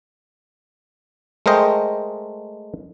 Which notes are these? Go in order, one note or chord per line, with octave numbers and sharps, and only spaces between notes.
G#3 A3 A#4 C5 D#5 G5